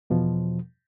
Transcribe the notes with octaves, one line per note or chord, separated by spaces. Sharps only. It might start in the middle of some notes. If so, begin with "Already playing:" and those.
E2 B2 F3